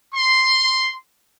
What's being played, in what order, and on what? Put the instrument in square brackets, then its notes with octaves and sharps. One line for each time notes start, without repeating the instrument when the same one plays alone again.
[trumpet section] C6